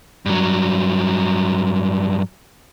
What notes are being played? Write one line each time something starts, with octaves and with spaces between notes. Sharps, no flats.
G2 F#3